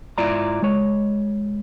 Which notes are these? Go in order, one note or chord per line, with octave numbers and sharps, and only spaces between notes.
G#2 E4 F4 D5 A#5
G#3 C#5